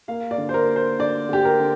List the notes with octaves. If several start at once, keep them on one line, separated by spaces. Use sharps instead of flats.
A#3 F5
D5
D3
C5
A#4
A#3
C5
D3 D5
D3 G4
A#4
D3